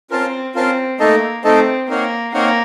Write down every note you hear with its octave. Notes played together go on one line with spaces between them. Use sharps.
C4 C#4 F4 A#4 F5 A5
C4 C#4 F4 A#4 F5 A5
A3 A#3 D#4 A4 D#5 A5
A3 C4 D#4 A4 D#5 A5
A#3 C4 D#4 A#4 C#5 F#5
A#3 C4 D#4 A#4 C#5 F#5